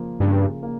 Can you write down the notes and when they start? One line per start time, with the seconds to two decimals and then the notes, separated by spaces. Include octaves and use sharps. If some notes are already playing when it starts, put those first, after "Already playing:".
Already playing: C#3 F3 A#3
0.20 G2 C#3
0.63 A#3